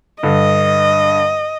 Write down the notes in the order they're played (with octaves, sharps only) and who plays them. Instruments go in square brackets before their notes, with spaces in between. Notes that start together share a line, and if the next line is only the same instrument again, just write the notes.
[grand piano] G2 D3 [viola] D#5